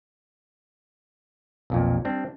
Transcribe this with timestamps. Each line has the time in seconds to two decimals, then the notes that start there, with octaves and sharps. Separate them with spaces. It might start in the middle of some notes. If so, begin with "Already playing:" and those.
1.70 B1 F2 A#2
2.05 G3 C4 D4